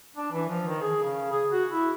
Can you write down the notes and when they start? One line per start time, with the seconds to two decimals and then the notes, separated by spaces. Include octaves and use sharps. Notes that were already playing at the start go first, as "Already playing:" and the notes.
0.16 D4
0.32 E3
0.49 F3
0.67 D#3
0.81 G#4
1.03 C#3
1.32 G#4
1.51 F#4
1.71 E4